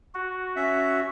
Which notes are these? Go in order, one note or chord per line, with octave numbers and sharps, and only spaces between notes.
F#4
C#4 E5